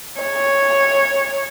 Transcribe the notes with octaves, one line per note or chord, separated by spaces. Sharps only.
C#5